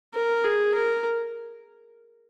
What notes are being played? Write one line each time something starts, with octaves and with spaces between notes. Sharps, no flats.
A#4
G#4
A#4